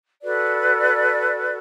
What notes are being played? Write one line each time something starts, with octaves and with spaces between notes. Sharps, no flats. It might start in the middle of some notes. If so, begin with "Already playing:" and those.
F#4 A4 B4 D5